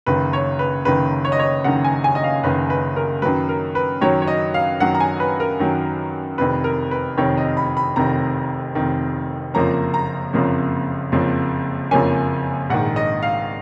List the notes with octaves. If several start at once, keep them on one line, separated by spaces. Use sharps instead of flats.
F#1 F#2 D#3 B4
C#5
B4
F#1 F#2 D#3 B4
C#5
D#5
C#5
F#1 F#2 D#3 F#5
G#5
G#5
D#5
F5
F#1 F#2 D#3 B4
B4
A#4
F#2 D#3 F#3 B4
A#4
B4
F#2 D#3 F#3 C#5
C#5
D#5
F5
F#2 D#3 F#3 F#5
A#5
G#5
B4
A#4
F#2 D#3 F#3
F1 F2 D#3 B4
A#4
B4
F1 F2 D#3 C#5
D#5
B5
B5
F1 F2 D#3 A#5
F1 F2 D#3
F#1 F2 F3 A#3 C#4 A#5
A#5
F#1 F2 F3 A#3 C#4
F#1 F2 F3 A#3 C#4
F#1 F2 F3 A#3 C#4 G#5
A#1 G#2 D#3 F#5
D#5
F5